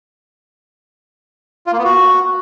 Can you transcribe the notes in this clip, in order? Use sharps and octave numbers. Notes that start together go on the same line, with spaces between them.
F4
A#3
B3
F#4